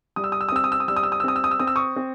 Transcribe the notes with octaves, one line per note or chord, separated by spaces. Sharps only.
G3 D#6
E6
D#6
E6
D#6
C4 E6
D#6
E6
D#6
G3 E6
D#6
E6
D#6
E6
C4 D#6
E6
D#6
E6
C4 D#6
E6
C#6 D#6
C4